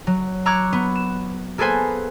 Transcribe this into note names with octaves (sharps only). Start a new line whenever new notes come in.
F#3
A#5 C#6 D6 E6 F#6 G#6
B3
E7
A#3 G#4 A4 B4 C5 G#5